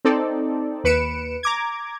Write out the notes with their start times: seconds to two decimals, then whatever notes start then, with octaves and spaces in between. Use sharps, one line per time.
0.05 C4 D#4 A4 D5
0.84 D#2 B4 C#7 D7 E7
1.43 A#5 D6 G#6